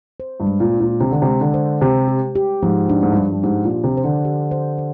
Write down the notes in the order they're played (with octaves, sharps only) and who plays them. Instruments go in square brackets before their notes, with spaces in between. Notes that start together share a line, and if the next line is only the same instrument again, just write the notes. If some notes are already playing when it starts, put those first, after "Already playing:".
[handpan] C5
[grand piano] G2
[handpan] G#3
[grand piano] A#2
[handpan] D4
[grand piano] A#2
[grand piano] C3 [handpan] D4
[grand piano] D3
C3
[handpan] G#3
[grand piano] D3
[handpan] C5
[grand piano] C3 [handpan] G4
[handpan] G4
G4
[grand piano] G#2 [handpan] F3
[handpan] D4
[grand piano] G#2
G2
[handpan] D4
[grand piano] G2
[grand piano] G#2 [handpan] G4
[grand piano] A#2
[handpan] G4
[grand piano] C3
[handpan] C5
[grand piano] D3
[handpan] G4
C5
C5